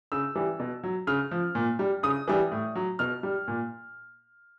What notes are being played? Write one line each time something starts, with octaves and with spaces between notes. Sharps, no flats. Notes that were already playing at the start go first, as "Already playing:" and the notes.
C#3 E6
E3 G3
B2
F#3
C#3 F6
F3
A#2
G3
C#3 D#6
E3 G3
A2
F#3
B2 F6
G3
A#2